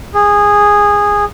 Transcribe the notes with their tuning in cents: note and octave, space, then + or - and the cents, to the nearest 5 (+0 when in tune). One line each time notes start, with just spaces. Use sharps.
G#4 -15